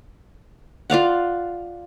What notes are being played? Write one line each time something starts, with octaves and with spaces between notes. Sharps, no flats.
F4 D5 F5 F#5